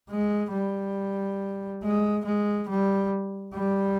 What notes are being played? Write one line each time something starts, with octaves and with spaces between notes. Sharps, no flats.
G#3
G3
G#3
G#3
G3
G3